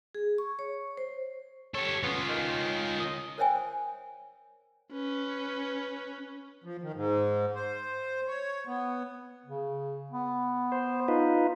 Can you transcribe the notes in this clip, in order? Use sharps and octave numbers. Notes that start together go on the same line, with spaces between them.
G#4
C#6
C#5
C5
G4 A4 C#5
B3 C#4 F4
D#3
D#5
A#4 C5 C#5 E5 G5 G#5
C#4 B4
F3
D#3
G#2
C5
C#5
B3
C#3
B3
C5
D#4 F4 B4